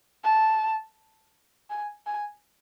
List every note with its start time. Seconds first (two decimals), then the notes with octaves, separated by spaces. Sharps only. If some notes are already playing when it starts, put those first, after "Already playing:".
0.24 A5
1.70 G#5
2.06 G#5